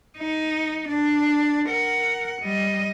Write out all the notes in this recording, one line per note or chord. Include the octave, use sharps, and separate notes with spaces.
D#4
D4
A#4 F#5
G3 D#5